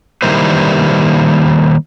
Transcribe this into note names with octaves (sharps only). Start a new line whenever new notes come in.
D#3 G3 A#3 E4 B4 C5